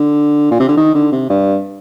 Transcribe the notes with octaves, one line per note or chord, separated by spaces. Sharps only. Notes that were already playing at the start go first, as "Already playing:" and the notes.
Already playing: D3
A#2
C3
D3
D#3
D3
C3
G2